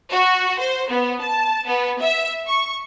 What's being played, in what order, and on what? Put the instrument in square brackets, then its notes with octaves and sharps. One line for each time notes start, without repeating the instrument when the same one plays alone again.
[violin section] F#4
C5
B3
A5
B3
E5
C#6